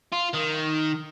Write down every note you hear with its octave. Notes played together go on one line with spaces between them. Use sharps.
F4
D#3